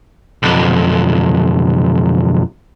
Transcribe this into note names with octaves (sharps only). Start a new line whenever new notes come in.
B1 F2